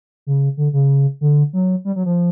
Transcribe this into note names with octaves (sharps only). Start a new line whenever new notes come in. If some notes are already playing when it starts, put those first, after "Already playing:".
C#3
D3
C#3
D3
F#3
G3
F#3
F3